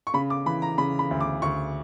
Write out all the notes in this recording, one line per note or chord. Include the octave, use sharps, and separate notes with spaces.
C#6
C#3 B5
D6
E3 B5
A#5
C#3 B5
B5
D2
D6
D2 C#6